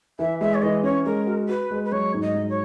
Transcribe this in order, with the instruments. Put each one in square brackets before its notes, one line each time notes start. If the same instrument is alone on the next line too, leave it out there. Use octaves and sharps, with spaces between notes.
[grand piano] E3 [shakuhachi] E5
[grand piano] G#3 [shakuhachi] E5
[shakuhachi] C#5
[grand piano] E3 [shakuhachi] D#5
[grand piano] C#4 [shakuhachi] C#5
[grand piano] G#3 [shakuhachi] A#4
[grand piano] F#4
[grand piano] F#4 [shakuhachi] B4
[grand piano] G#3
[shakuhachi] B4
[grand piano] F#3 [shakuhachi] C#5
[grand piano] G#2
[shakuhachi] D#5
[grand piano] F#3
[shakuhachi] C#5